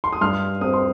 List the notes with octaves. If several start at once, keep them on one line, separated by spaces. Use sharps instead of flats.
C6
D#6
G2 C6 F6
C4 D#6
C6